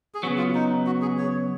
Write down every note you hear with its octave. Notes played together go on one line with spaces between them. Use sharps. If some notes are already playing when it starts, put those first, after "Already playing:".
G#4
C#3 F#3 B3 F#4
F4
D#4
F#4
G#4
C#5